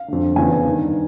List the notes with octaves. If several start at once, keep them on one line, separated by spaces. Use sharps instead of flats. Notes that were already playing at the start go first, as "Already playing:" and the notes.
Already playing: F5
F2 D3
E2 C#3 E3 G#5
G2 D#3